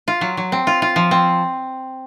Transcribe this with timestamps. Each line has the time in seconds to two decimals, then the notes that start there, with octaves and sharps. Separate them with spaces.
0.08 F4
0.21 F#3
0.37 F#3
0.52 C4
0.67 F4
0.82 F4
0.96 F3
1.11 C4